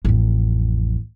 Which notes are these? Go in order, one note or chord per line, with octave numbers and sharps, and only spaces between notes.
A1 F2